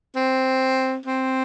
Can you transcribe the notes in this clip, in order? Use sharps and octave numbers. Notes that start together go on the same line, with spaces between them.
C4
C4